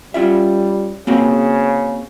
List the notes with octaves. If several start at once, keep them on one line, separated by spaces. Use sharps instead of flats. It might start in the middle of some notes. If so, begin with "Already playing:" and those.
G3 C#4 F4 E5
C#3 A#3 C4 F#4